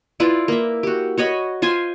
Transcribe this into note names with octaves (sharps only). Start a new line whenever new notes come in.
E4 F4 B4 D5
A#3 E5
F#4 G4
F#4 C#5 D#5 B5
F4 C5 G#5 C6